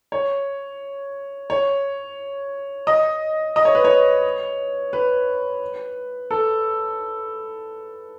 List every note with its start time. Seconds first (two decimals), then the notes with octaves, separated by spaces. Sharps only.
0.12 C#5
1.50 C#5
2.87 D#5
3.56 D#5
3.65 C#5
3.75 B4
3.84 C#5
4.93 B4
6.31 A4